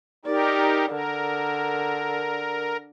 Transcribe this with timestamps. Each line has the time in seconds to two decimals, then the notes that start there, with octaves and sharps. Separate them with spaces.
0.25 D#4 G4 A#4 D5
0.88 D3 A#4